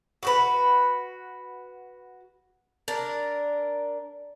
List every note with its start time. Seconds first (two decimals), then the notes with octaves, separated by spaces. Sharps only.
0.23 F#4 G4 B4
2.88 D4 A#4